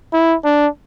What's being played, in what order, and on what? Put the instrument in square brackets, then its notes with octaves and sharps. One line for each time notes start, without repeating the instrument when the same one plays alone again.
[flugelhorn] E4
D4